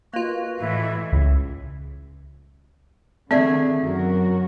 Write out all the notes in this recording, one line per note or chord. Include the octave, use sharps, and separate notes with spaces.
A#3 F4 F#4 B4 D#5
A2 E3 E4
C#2
D3 D#3 A3 C4 G#4 D5
F#2 F#4 A#4